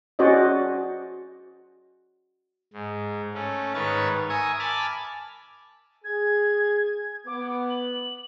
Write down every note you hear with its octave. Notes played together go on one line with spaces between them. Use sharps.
C#4 F#4 C5 D5 D#5
G#2
A3 C#4
G#2 D#3 B4 C#5 C#6 A6
A#4 E5 G#5 C#6 D#6
G#5 A5 B5 D6 F6 A6
G#4 G#6
B3 D6
F#7